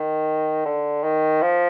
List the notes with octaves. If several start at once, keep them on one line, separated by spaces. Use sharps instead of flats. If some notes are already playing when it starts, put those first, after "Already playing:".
Already playing: D#3
D3
D#3
F3